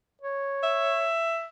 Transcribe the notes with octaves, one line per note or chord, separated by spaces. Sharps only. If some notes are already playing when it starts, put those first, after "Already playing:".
C#5
E5